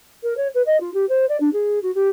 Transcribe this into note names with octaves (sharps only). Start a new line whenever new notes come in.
A#4
C#5
B4
D#5
F4
G4
C5
D5
D4
G#4
F#4
G4